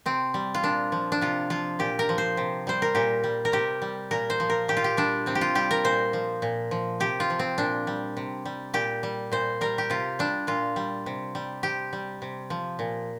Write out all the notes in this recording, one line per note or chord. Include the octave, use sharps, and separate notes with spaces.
C3 C4
G3
F4
A#2 D4
F3
D4
C3 F4
F3 F4
A#2 G4
A#4
F3
C5
C3
G3 C5
A#4
A#2 G4
G3
A#4
C3 G4
G3
A#2 A#4
C5
F3
A#4
A#2 G4
F4
G4
G3 D4
C3 C4
G4
F4
G3 G4
A#4
A#2 C5
F3
A#2
F3
C3 G4
F4
F3
C4
A#2 D4
G3
C3
G3
A#2 G4
G3
A#2 C5
G3 A#4
G4
C3 F4
G3 D4
A#2 F4
G3
C3
G3
C3 G4
G3
C3
F3
A#2